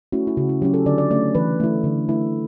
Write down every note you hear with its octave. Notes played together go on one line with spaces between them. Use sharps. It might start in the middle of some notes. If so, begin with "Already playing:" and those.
A3 C#4 E4 F#4
E4
C#3 F#4
E4
F#3 C#4 G4
A4
D3 D5
D5
A3 C#4 D5
E3 B4
A3 E4
D3
A3 E4